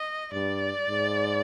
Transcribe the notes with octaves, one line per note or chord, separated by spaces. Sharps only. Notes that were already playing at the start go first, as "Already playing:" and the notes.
Already playing: D#5
G2 D5
G#2